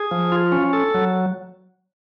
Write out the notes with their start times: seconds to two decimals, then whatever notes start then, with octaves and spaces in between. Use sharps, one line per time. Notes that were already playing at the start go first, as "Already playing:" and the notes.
Already playing: G#4
0.11 F3
0.32 F4
0.52 C#4
0.73 A4
0.94 F#3